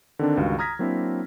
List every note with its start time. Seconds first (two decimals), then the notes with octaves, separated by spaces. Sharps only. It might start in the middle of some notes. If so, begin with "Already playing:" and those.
0.19 D3 D#3 C4 D4
0.37 C#2 G2 D#3 F#4 F5
0.59 A#5 D#6 F6 G#6 A#6 B6
0.79 F#3 A#3 C4 D4 E4